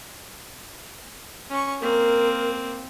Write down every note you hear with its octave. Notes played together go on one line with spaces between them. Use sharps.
C#4 C#6
A#3 C4 A#4